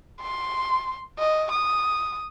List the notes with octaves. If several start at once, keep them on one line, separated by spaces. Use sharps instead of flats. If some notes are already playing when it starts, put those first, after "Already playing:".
C6
D#5
D#6